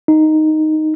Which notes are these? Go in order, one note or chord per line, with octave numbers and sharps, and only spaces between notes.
D#4